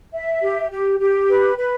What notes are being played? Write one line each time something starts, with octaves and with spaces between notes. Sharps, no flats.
E5
G4
G4
G4
B4
B4